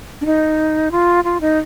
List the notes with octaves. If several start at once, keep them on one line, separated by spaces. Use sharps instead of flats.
D4
D#4
F4
F4
D#4